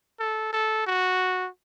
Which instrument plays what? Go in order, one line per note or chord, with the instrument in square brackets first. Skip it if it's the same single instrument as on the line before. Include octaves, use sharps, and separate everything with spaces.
[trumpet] A4
A4
F#4